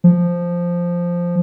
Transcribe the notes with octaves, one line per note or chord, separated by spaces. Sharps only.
F3